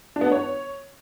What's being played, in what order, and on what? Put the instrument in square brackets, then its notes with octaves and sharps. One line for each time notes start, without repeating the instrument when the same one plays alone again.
[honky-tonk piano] D4
B3
D4
C#5